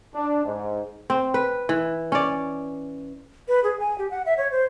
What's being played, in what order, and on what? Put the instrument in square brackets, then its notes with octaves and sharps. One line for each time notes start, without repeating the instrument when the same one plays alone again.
[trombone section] D4
G#2
[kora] C4
B4
E3
C#4 D5
[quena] B4
G#4
G#5
G4
F#5
E5
C#5
C5